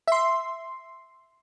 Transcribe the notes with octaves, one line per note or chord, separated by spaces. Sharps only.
E5 C6